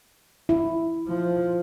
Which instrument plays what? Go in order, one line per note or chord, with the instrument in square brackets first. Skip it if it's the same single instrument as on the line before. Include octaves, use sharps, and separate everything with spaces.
[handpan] E4
[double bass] F3